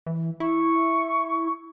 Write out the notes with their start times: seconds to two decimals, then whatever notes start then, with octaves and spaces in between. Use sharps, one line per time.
0.06 E3
0.40 E4 C#6